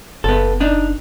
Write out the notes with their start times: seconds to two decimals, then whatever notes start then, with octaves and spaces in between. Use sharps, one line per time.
0.24 F#1 B3 A4
0.60 D4 D#4